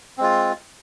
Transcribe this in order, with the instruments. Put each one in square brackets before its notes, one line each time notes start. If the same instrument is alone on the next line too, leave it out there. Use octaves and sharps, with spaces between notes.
[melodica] C4
G#3
F4